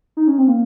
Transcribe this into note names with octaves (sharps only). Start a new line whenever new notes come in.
D#4
C#4
C4
A#3